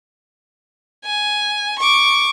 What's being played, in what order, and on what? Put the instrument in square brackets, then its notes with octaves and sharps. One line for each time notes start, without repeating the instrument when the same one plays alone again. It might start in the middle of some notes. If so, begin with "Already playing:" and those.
[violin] G#5
C#6 D6